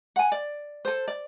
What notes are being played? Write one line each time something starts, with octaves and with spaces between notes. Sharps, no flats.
F#5 G#5
D5
A4 C5
D5